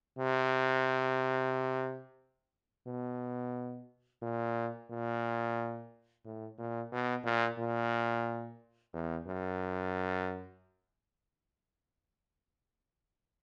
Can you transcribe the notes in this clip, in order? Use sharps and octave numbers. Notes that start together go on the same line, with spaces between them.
C3
B2
A#2
A#2
A2
A#2
B2
A#2
A#2
E2
F#2